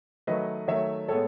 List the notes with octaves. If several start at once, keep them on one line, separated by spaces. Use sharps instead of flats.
D#3 F#3 A3 B4 D#5
D#3 F#3 A3 C#5 E5
A2 G#3 B3 A4 C#5